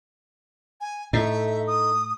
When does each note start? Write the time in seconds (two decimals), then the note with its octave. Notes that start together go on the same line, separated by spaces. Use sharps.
0.81 G#5
1.13 A2 A3 D#4 E5
1.67 D#6